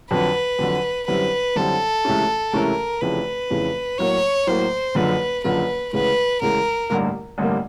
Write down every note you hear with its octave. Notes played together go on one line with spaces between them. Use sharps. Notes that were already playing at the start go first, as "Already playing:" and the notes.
F2 D3 F#3 B4
F2 D3 F#3
F#2 D3 G3 C4 E4 B4
F#2 D3 G3 C4 E4 A4
C#2 C3 E3 A3 C#4
C#2 C3 E3 A3 C#4 A#4
F1 F2 C#3 E3 B4
F1 F2 C#3 E3
A2 F#3 A#3 C#5
A2 F#3 A#3 C5
F#1 F#2 D3 F3 B4
F#1 F#2 D3 F3 B4
D2 C#3 E3 G#3 B4
D2 C#3 E3 G#3 A#4
A1 G2 D3 G3 A#3
A1 G2 D3 G3 A#3